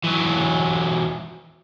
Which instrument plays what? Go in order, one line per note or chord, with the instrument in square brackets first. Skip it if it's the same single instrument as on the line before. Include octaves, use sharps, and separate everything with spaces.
[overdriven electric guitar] E3 F#3